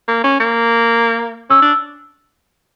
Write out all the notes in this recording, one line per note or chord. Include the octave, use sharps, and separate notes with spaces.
A#3
C#4
A#3
C#4 E6
D4